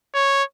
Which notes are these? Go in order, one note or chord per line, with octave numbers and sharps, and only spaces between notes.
C#5